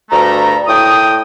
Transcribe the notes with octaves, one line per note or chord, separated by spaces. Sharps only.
D2 G2 A3 A#5
A2 G5 D#6